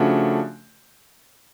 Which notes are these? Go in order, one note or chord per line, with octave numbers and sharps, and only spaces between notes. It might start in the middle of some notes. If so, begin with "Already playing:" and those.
Already playing: C#3 F3 A3 D4 F#4